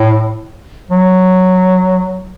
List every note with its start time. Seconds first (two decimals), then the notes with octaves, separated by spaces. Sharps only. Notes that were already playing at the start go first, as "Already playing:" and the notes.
Already playing: A2
0.91 F#3